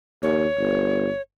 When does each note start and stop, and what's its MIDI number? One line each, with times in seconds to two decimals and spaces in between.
0.23 0.46 39
0.23 1.21 73
0.59 1.09 31